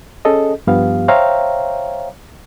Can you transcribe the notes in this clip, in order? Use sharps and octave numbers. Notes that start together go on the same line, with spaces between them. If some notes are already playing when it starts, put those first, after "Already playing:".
C#4 G#4 A4 D#5
G2 F3 B3 G4 F5
C5 C#5 E5 F5 G5 A#5